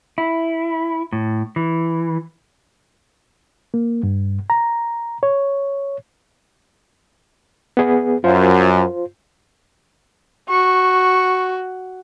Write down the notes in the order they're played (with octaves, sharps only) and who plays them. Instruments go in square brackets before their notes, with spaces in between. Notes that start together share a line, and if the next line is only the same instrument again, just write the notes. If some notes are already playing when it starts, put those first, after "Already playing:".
[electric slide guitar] E4
A2
E3
[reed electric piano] A#3
G2
A#5
C#5
B3 G#4 B4
[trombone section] F#2 [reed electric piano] F4 C5
[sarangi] F#4 [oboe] C#6